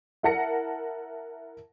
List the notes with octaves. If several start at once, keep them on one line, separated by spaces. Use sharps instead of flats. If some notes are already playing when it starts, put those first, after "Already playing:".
E4 A#4 F#5 A5 A#6 C#7